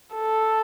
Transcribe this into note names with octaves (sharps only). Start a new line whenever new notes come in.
A4